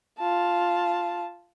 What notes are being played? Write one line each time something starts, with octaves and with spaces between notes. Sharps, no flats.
F4 A5